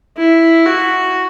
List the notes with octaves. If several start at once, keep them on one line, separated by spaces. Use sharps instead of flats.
E4
F#4